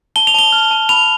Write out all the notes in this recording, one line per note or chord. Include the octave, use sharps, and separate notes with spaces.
A5 G7
F7
A5 G7
F6
A5
B5 F7